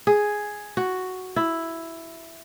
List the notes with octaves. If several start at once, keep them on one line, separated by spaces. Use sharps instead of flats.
G#4
F#4
E4